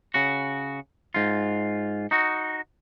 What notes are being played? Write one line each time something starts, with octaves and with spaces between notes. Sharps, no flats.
C#3 F#4
G#2 F4
D#4 F#4